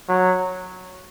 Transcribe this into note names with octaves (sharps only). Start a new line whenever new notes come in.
F#3